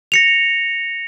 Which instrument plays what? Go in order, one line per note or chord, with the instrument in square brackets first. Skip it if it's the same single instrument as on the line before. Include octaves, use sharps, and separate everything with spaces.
[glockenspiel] A#6 C#7 F7